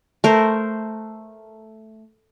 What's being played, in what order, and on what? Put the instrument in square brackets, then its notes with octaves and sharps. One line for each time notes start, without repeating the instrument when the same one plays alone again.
[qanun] A3 A#4 C5